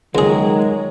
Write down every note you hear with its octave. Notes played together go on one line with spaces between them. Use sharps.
C#2 D#3 F#3 G#3 G#4